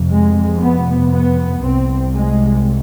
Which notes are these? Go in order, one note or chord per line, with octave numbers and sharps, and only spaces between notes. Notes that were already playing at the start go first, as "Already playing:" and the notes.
Already playing: F1 F2 C3
G#3
B3
B3
C2 C3 C4
G#3